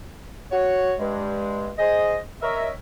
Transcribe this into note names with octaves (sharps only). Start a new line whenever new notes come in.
F#4 C#5
G2 G#3
G#4 C5 D#5
A#4 C#5 D#5 E5